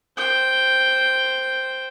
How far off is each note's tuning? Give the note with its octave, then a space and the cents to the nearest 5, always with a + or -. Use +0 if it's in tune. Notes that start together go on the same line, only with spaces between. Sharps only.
C5 +0 G5 +0